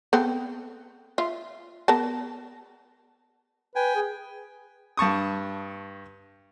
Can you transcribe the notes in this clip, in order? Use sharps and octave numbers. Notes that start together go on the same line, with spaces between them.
B3 C4 A4
F4 E5
B3 A#4 A5
B4 G5 G#5
G#4
G2 A5 C#6 D#6